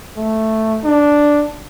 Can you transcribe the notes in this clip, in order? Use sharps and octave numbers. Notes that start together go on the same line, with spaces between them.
A3
D4